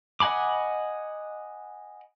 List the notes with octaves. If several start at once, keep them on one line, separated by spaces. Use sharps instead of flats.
D#5 F#5 G#5 B5 D6